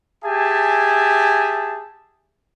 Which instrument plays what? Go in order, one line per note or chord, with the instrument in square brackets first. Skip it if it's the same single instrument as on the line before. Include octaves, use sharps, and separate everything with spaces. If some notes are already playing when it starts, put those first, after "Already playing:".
[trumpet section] G4 G#4 E5 G#5 A5